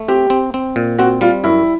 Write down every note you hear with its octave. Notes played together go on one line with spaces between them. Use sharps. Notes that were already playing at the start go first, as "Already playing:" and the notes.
Already playing: A3
C4 G4
C4
C4
A#2
C4 F#4
G3 F4
F#2 E4